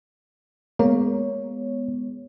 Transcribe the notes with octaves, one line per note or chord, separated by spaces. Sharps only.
G#3 A#3 B3 C#5